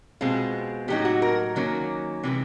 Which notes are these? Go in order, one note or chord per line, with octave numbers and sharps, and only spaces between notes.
B2 G#3 C4 F4 G#4
A2 F#3 A#3 D#4 G4
F#4
A#4
D#3 F#3 A#3 C#4
C3 E3 G#3